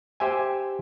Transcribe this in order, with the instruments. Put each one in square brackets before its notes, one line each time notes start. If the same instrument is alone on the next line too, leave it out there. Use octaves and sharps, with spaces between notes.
[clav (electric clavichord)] G4 C5 E5 G#5